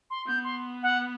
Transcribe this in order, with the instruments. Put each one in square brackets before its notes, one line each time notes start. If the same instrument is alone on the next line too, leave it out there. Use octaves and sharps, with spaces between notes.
[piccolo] C6
[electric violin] B3 [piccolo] G6
[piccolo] C6
F#5